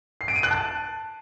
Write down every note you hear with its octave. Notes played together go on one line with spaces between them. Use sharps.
C7
D7
D#7
F#6
A5